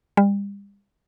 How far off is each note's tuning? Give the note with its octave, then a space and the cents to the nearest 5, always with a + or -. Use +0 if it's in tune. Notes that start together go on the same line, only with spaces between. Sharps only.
G3 +40